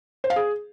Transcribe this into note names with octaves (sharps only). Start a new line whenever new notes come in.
C5
F5
G#4